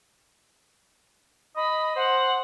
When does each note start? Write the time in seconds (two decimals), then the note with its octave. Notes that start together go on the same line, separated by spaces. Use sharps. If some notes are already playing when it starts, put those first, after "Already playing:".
1.56 D#5 B5
1.96 C5 F#5